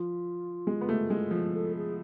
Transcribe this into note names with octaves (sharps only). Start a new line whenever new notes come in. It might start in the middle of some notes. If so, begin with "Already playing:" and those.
Already playing: F3 F4
G#3
B3
A3
G#3
F3
A4
G#4